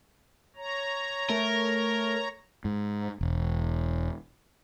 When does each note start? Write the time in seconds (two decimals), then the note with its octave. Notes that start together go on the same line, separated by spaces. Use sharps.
0.56 C#5 A#5
1.30 A3 A#4
2.65 G#2
3.21 E1